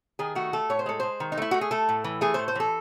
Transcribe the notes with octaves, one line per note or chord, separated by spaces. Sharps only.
D#3 G#4
A3 F#4
A3 A4
A2 C#5
C5
G#3 A4
G#3 C5
D#3
D#4
A3 E4
A3 F#4
G#4
A3 A4
A2
E3
A3 G#4
A2 C5
C5
E3 A4